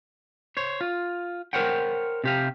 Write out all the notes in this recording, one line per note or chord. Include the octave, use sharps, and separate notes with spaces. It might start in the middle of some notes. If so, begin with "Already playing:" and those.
C5 C#5
F4
A#4 C5 C#5 F#5 G5
C3 G4 F5